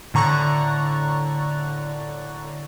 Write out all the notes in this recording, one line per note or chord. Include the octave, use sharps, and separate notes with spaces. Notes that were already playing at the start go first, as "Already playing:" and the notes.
A2 D3 A#5 C#6 F#6 A6